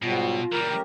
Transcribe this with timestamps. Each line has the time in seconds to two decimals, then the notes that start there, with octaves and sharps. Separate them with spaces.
0.02 G#2 B2 F#3 G3 F4
0.52 A#2 C#3 E3 G3 A#4
0.69 A3 C#4 G4 G5